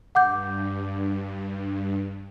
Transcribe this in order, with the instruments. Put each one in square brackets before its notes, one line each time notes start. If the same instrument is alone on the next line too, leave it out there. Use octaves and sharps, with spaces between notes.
[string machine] G2 [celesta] F#5 D6 G6